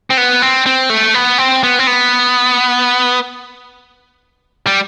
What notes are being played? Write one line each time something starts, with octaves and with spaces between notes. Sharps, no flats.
C4
B3
C4
C4
A3
B3
C4
B3
C4
B3
G3